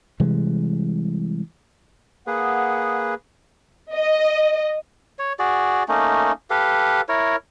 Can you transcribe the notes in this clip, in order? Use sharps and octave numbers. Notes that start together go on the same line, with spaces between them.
C3 E3 G3 G#3
A#3 G#4 B4 F#5 D#6
D#5
C#5
F#4 G#4 D5
A3 A#3 C#4 D#4
G4 A4 B4 F5
E4 A#4 C#5